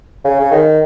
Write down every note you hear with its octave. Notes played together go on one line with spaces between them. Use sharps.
C#3
C#3
D#3